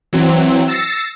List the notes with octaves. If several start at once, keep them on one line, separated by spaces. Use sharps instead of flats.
E3 F#3 C4
E6 A6 A#6 C7 C#7